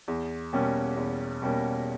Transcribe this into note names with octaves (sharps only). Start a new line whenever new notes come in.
E2
B2 G3 A#3 C#4
E2
B2 G3 A#3 C#4